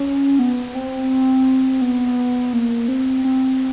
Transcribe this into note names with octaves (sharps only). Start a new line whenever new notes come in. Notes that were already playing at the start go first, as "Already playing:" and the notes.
Already playing: C#4
B3
C4
B3
A#3
C4
C4